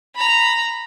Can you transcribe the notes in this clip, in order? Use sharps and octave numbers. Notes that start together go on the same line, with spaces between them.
A#5 B5